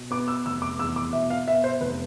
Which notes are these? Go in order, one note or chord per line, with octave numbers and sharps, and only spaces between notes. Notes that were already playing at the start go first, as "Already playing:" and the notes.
Already playing: B2
B3 D6
E6
F1 E6
D6
E2 E6
D6
B2 E5
F5
B3 E5
C5
F1 B4